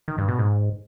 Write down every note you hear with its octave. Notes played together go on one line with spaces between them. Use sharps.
D#3
G2
B2
G#2